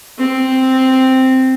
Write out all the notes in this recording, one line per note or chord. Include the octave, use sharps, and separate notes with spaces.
C4